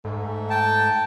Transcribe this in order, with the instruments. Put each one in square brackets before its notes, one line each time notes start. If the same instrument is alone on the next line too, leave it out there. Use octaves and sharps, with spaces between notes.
[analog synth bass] G#2 [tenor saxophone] A3
[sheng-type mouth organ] G5 [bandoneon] A5